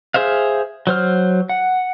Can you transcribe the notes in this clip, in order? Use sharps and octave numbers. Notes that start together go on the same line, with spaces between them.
G#4 C5 E5 F5
F#3 C5 F6
F#5